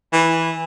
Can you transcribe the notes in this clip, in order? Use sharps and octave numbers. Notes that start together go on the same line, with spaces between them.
E3